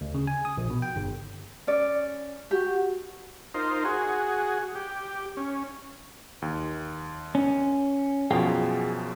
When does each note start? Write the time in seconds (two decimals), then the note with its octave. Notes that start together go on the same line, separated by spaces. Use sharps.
0.01 D2
0.14 C#3
0.27 G#5
0.45 D#6
0.57 A#1
0.70 B2
0.82 G5
0.96 G1
1.67 C#4 D5
2.51 F#4 G4
3.54 D#4 F4 A#4 C5
3.85 F#4 G#4
4.75 G4
5.37 C#4
6.42 D#2
7.35 C#4
8.31 F#2 B2 F3 G#4 F5 G5